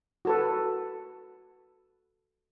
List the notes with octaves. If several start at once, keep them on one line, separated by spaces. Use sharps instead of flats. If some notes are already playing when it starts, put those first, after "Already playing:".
F#4 A4 B4